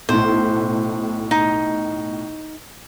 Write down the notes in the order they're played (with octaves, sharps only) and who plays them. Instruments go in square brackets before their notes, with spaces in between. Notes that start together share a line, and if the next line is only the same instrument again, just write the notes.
[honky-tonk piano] B1 A2 [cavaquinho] C5
[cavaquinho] D#4